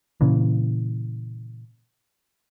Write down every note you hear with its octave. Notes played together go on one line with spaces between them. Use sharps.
A#2 C#3 E3